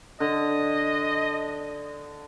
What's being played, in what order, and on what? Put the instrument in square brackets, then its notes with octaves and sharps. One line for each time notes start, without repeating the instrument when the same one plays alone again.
[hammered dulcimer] D3 [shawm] D#5